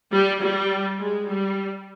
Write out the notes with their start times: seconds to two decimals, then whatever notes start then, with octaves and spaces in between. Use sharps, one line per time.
0.12 G3
0.42 G3
1.00 G#3
1.28 G3